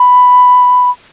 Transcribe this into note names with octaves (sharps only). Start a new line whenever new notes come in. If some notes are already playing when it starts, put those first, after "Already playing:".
Already playing: B5